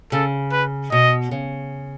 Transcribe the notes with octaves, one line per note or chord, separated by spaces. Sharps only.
C#3 A4
B4
B2 D#5
C#3